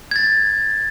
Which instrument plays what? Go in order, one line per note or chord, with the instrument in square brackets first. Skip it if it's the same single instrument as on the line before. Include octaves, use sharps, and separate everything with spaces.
[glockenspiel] G#6 A6